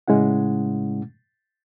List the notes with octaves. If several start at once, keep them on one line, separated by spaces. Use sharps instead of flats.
A2 C#3 G#3 C#4 E4 F#5